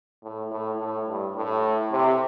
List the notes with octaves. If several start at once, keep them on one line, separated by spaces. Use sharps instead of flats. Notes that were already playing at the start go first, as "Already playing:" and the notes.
A2
A2
A2
G2
A2
C3